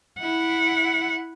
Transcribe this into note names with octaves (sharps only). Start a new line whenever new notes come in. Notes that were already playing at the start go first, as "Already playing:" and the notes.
E4 F#5